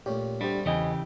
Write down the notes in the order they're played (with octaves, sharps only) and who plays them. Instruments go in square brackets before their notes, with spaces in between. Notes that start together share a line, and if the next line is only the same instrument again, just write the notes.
[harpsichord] A#2 C#4 [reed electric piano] A3 G4
[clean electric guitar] G3 [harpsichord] A3 B3 C4 [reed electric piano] D4 G4
[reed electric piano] E2 D#5 G#5 [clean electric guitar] C#3 E3 G4